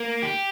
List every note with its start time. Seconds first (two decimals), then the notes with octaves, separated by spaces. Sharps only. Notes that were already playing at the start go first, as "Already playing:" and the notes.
Already playing: A#3
0.23 G4